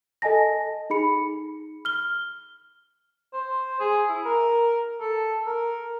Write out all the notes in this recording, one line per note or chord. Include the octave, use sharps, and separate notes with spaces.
A4 D#5 G#5 A5 A#6
D#4 G#4 B5 C#7
F6 G7
C5
G#4
E4
A#4
A4
A#4